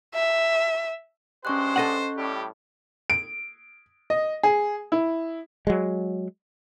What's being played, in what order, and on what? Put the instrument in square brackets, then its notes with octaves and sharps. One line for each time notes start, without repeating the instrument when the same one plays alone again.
[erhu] E5
[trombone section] G2 G#3 G4 [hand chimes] C#4 C#6 F#6 [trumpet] C5
[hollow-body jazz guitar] A4 D#5 F#5
[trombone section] A2 G3 [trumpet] G4
[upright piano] D7
D#5
G#4
E4
[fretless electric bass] F#3 G#3